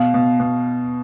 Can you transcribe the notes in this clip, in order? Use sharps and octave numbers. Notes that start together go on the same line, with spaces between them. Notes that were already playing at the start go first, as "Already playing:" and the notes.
Already playing: B2 F5
B2
B2